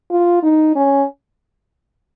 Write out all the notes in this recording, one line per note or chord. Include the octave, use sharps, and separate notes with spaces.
F4
D#4
C#4